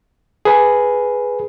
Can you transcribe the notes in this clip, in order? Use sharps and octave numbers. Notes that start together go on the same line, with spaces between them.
G#4 B4